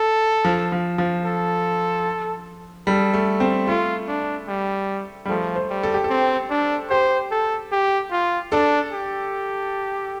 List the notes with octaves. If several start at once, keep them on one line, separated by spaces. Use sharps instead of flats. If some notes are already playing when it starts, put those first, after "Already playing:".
Already playing: A4
F3
F3
F3
A4
G3 A4
A3
C4
A3 F4
D4
G3
G3
F3 A3
C5
G3
A4
G4
A4
C4
D4
G4 C5
A4
G4
F4
D4 A4
G4